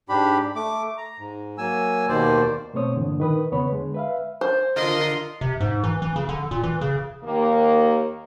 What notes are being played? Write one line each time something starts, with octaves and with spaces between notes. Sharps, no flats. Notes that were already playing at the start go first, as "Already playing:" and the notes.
G#2 D4 G4 B5
A3 D6
A#5
G#2
F#3 A#3 G#5 E6
D#2 B2 D#3 A#3 C5 D5
B2 A3 C4 C5 C#5 D#6
G2 A#2 D3 E3
D#3 B4 D#6
E2 C#3 B3 B4 C#5 B5
D3 G#3
B4 E5 F5
C5
D3 F4 A#4 D#5 C6
C3
G#2
E3
E3
C#3
D3
A#2
E3
C#3
D#2 A#3